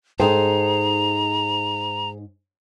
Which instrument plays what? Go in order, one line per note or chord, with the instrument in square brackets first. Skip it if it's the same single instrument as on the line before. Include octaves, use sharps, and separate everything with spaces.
[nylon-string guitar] G#2 A4 G5 [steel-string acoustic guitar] D#4 G#4 C5 [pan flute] A#5